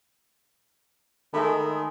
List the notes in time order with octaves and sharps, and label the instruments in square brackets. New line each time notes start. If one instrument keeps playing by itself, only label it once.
[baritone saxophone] D#3 [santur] G#3 A3 B5